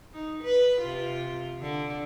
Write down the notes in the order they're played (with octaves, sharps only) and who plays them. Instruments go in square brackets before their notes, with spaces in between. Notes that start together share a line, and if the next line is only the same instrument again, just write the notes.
[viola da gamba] D#4
B4
C3 F4
D3